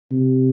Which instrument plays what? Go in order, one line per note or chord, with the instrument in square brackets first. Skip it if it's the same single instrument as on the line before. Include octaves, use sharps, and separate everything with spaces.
[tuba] C3